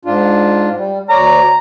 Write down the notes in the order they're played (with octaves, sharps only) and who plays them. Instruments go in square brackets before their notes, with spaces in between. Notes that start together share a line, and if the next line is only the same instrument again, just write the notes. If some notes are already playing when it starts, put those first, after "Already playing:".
[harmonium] G#2 D4 F4
G3
[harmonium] D2 C#5 D5 [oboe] A#5